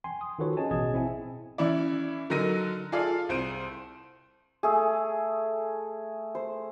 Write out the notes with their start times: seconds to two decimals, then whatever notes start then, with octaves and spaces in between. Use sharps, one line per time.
0.04 G5 G#5 C6
0.21 D#6
0.39 D#3 F4 F#4 A4 B4 C#5
0.57 C#4 G#4 C#5 D#5 G#5 A5
0.71 A1 B2 G#4 D#5 A5 G#6
0.94 C4 E4 E5 G#5
1.58 E3 C#4 E4 D5
2.30 D3 F#3 D#4 A#4 A#6 D#7
2.92 F4 G#4 A4 D5 F5
3.29 C2 C5 D7 D#7
4.63 A3 G#4
6.35 C5